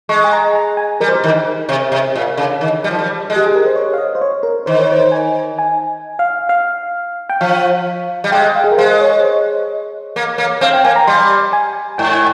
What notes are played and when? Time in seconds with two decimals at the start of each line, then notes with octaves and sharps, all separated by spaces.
0.09 G#3 C#6
0.24 G#5
0.33 A#5
0.55 A#5
0.77 G#5
1.01 G3 A#4
1.09 C5
1.15 A#4
1.24 D#3
1.69 C3
1.92 C3
2.16 A#2
2.37 C#3
2.61 D#3
2.84 G3
2.91 F3
2.99 G3
3.30 G#3
3.36 G4
3.46 G#4
3.56 A#4
3.66 C5
3.76 C#5
3.94 F5
3.98 D#5
4.15 C5
4.21 C#5
4.43 A#4
4.66 D#3 C5
4.79 C#5
4.92 C5
5.12 G#5
5.59 G#5
6.19 F5
6.49 F5
7.30 G5
7.41 F3 F5
8.24 G3
8.32 G#3 G5
8.55 F5
8.64 G#4
8.72 A#4
8.78 G#3 C5
9.01 C#5
9.20 C5
9.25 C#5
10.16 A#3
10.38 A#3
10.61 C4 F5
10.73 G5
10.84 A#3 G#5
10.96 A#5
11.07 G3 C6
11.53 G#5
11.98 G#2 G5
12.12 G#5